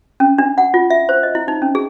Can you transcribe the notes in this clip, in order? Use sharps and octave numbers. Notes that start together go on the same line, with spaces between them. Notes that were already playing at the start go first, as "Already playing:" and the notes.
C#4
D4
F#5
F4
E5
C5
D#5
E4
D#4
C#4
G#4